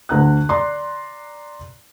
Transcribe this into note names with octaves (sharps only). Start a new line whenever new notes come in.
D2 A#5 F#6
D5 A#5 C6